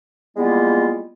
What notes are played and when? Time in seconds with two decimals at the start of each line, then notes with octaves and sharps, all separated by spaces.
0.36 G3 G#3 A#3 B3 E4 F4